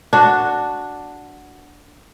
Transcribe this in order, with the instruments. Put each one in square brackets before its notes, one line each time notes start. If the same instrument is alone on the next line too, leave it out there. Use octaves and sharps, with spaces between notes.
[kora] D4 F#4